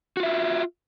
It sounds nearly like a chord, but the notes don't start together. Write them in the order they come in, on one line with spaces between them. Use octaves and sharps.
F#4 F4 E5